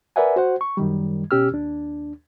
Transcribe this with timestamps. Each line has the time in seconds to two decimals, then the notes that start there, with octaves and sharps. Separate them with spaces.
0.16 A#4 B4 D5 E5 F#5 G#5
0.36 F#4 C5 F#5
0.61 C#6
0.77 F#2 D#3 G3
1.31 B2 C#4 G4 E6 F6
1.51 D#2 D4